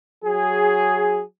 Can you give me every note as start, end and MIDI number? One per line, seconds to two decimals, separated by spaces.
0.24 1.22 54
0.24 1.22 68